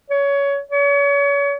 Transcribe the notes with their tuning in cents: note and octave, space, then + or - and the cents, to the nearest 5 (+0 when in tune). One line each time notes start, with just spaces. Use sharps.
C#5 +20
C#5 +35